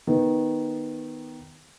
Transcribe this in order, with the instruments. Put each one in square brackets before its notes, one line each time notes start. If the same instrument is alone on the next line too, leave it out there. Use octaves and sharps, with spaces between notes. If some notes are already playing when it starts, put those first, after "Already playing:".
[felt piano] D#3 B3